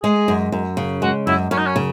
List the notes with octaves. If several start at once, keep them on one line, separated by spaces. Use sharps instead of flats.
G#3 G#4
F#2
F#2
C#3
G#3 F#4
F#2 E4
F#2 C#4
D#4
C#4
C#3